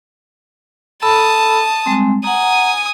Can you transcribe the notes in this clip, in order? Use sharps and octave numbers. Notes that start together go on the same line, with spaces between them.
A4 A5 B5 D#6 E6
G3 G#3 C4
F#5 G#5 A#5 D#6